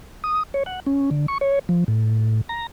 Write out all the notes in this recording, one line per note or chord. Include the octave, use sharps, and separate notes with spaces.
D#6
C#5
F#5
C#4
D3
C#6
C#5
F3
A2
A#5